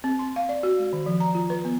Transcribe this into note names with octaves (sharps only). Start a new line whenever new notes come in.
C4
C6
F5
D5
F#4
G#3
D#3
F3
A#5
F4
B4
B3